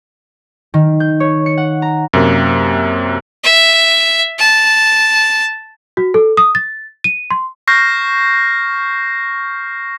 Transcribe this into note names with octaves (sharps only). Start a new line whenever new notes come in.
D#3
G6
C#5
C#7
F#5
A#5
F#2 C3 A#3
E5
A5
F#4
A4
D#6
A6
D#7
C6
C#6 F6 G6 A#6 C7